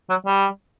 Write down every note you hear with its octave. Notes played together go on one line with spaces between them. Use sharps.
F#3
G3